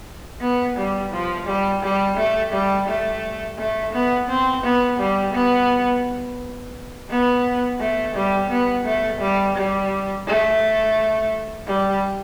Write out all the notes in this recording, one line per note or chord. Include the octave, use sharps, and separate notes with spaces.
B3
G3
F3
G3
G3
A3
G3
A3
A3
B3
C4
B3
G3
B3
B3
A3
G3
B3
A3
G3
G3
A3
G3